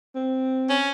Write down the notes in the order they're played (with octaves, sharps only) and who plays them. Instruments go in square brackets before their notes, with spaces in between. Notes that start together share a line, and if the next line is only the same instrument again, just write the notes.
[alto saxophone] C4
[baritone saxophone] C#4